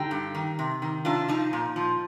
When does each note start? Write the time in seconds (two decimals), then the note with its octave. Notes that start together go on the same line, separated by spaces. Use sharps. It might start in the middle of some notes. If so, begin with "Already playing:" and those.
Already playing: D3 D#4 G4
0.11 G2
0.35 D#3
0.59 C3
0.82 D#3
1.05 C3 D4 F4
1.28 F3 D#4
1.53 A#2
1.76 F3